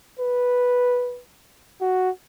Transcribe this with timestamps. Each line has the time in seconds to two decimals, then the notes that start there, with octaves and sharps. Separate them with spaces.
0.19 B4
1.81 F#4